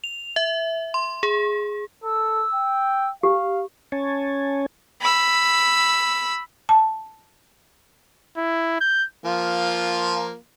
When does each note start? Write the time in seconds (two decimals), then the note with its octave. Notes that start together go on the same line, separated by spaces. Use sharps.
0.04 F7
0.36 E5
0.94 C6
1.23 G#4
2.04 A4 E6
2.54 G5
3.23 G4 F5
3.92 C#4 C#5 G#5 A5
5.00 B5 E6
6.69 A5
8.37 E4
8.80 G6
9.24 F3 A#3 F4